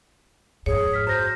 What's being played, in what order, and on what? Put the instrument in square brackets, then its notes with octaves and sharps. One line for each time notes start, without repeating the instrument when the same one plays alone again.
[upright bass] F2 G#2 [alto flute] G#4 [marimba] C#5
[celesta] F6 B6
[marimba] F#2 [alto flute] C5 [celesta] F6 A#6